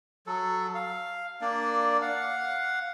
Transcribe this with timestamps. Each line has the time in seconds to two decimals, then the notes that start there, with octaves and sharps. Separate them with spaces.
0.27 F#3 A4
0.75 F5
1.42 A#3 D4 D5
2.02 F5 F#5